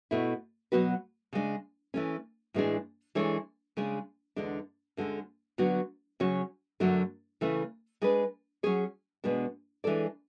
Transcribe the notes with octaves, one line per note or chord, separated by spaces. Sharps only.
B2 A3 E4
B2 F#3 B3 F#4 B4
C#3 G#3 D4
E3 A3 C#4
A2 E3 G#3 D4 G#4
E3 G#3 D4 A4 C#5
C#3 G#3 D4 G#4
E2 D3 G#3 D4
D2 D3 G#3 C#4
D3 F#3 B3 F#4
C#3 F#3 C#4 F#4 C#5
F#2 D3 F#3 A3 D4
C#3 E3 A3 C#4
G#3 D4 G#4 B4
F#3 C#4 G#4 C#5
E2 B2 G#3 B3 D4
E3 G#3 D4 A4 D5